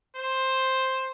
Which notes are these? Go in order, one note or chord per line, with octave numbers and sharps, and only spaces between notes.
C5